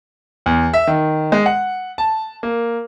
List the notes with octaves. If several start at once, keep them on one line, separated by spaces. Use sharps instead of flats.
E2
E5
D#3
G#3
F#5
A5
A#3